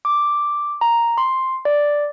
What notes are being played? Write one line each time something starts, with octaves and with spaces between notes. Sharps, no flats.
D6
A#5
C6
D5